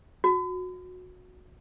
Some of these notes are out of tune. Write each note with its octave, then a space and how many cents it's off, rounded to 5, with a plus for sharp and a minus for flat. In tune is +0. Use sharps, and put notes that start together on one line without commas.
F#4 -20